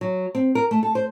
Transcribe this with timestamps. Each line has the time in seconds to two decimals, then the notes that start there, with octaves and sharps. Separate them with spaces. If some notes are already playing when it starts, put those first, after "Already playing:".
0.01 F#3
0.35 C4
0.55 A#4
0.71 A3
0.83 A4
0.95 C5